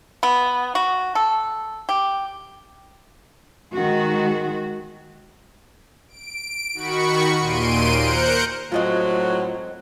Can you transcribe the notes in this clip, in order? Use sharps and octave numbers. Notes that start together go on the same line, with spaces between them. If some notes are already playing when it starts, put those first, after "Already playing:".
B3
F#4
A4
G4
D#3 G#3 F#4
D7
D#3 F#4 B5 C#6 C#7
D#2 A#2 C6 D7 D#7
A#4 C5 F#6 G6 C#7 D7
A2 F3 F#3 G#3 C4 F4 D#5